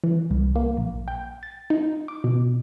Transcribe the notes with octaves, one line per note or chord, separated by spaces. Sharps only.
E3
C2
A#3
A#1
G5
A6
D#4
D6
B2